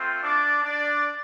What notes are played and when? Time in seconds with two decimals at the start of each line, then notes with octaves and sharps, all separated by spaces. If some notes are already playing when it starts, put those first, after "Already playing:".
Already playing: A3 C4 F4
0.23 D4 D5
0.63 D4 D5